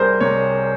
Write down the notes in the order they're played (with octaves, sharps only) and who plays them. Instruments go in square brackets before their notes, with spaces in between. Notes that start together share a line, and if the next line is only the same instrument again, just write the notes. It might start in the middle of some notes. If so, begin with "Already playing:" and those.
Already playing: [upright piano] C2 G3 G#4 A#4 C5
C3 C#5